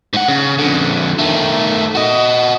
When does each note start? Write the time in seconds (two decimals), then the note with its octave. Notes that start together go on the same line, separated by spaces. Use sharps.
0.13 G#2 F#5
0.28 C#3
0.59 F2 D3
1.19 D#3 A3
1.95 F#4 D#5